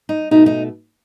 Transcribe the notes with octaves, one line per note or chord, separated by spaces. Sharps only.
D#4
B2 A3 D#4
D#4